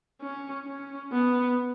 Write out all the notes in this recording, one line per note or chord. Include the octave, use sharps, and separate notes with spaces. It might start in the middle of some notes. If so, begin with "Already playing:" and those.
C#4
C#4
B3